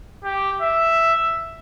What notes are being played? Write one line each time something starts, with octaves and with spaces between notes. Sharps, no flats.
G4
E5